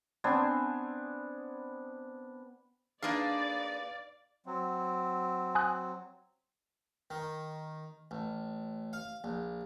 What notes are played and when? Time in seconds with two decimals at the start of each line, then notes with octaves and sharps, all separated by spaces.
0.24 B3 C4 D4 G#5
3.03 A#3 D4 D#4 G#4 B4 D5 F5
4.46 F#3 C4
5.55 G#5 D#6 F#6
7.10 D#3
8.11 A1
8.93 F5
9.24 A#1